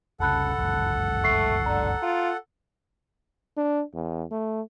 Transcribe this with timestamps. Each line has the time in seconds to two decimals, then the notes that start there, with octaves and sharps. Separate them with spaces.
0.20 F1 C2 C#3 A4 F#5 A5 B5 F#6
0.58 G1 C#2 F#2
1.24 A3 C#6 C7
1.66 D3 A#5
2.02 F4
3.57 D4
3.94 E2
4.31 A3